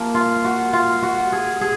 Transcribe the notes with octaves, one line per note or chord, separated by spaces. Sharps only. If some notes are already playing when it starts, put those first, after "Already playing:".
Already playing: F3 A#3
F4
F#4
F4
F#4
G#4
G#4